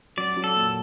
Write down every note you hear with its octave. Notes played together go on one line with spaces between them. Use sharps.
F#3 D5
F#3
A4
A#2